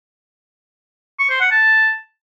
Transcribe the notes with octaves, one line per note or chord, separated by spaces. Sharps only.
C#6
C5
F#5
A5